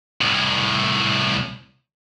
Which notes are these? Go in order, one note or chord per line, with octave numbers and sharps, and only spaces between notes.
C2 A2